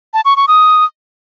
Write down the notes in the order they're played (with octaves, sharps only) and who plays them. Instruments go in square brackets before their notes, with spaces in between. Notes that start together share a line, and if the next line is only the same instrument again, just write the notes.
[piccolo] A5
C#6
C#6
D#6